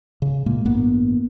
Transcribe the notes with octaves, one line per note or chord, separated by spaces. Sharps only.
C#3
A#2 G#3 A#3
A1 G2 A#3 B3